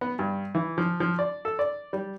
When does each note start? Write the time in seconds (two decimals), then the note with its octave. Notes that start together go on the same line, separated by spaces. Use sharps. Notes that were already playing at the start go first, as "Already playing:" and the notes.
0.01 B3
0.19 G2
0.55 E3
0.78 F3
1.00 F3
1.19 D5
1.45 A4
1.59 D5
1.93 G3